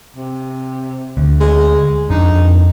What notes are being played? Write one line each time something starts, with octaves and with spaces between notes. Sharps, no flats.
C3
D2
G#3
F2 D4 D#4